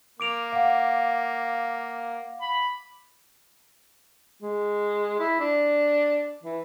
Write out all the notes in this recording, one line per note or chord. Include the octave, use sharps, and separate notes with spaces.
A#3 D6 D7 F7
F5 F#5
B5
G#3
E4
D4
E3